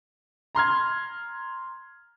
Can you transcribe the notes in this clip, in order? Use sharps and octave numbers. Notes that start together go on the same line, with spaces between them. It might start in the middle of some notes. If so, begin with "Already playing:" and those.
A#5 C6 F6 G#6